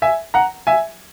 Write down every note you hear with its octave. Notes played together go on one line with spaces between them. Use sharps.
E5 G#5
F#5 A#5
E5 G#5